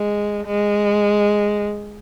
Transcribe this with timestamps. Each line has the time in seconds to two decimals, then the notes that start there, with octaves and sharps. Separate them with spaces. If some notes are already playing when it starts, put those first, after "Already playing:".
Already playing: G#3
0.46 G#3